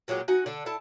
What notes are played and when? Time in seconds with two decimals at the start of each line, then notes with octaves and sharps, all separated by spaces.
0.08 A#2 F#3 G#3 G4
0.28 D#4 F#4 G#5
0.46 D3 D4 A4
0.66 E4 A4 A5